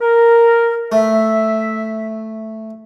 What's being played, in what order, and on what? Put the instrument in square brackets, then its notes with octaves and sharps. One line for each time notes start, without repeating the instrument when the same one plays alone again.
[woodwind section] A#4
[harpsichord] A3 [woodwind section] E5